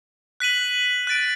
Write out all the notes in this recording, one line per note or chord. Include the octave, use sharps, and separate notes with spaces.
F#6 B6 D#7 F#7
F#6 A6 D7